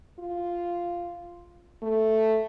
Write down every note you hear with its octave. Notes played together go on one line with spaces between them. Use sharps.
F4
A3